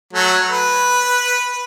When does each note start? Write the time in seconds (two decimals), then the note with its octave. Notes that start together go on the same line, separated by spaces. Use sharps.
0.13 F#3 A3
0.49 B4